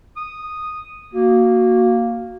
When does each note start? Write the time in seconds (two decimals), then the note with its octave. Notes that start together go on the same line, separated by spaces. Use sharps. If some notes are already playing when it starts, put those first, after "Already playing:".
0.17 D#6
1.13 A#3 F#4